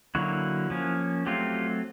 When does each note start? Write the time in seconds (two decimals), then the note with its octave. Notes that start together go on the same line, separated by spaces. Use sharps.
0.15 D3 F#3 A#3 E4 F#4
0.70 F3 A#3 C#4
1.26 F#3 A3 C4 F4 G4